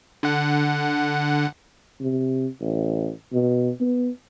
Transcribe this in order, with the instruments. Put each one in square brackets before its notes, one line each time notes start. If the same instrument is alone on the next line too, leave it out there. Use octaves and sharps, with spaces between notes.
[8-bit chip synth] D3 F#5
[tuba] C3
A1
B2
B3